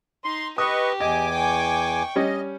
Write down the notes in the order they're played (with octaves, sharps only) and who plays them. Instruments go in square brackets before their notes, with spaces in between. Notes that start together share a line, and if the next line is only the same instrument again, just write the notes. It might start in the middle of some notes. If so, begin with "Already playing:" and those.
[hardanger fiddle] D#4 [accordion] C6
[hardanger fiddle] G4 [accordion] B4 D#5 C#6 [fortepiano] D#6
[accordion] E2 G#5 D6 [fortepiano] D#5
[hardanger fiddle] G5 C#6
[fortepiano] G3 C#4 [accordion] D#5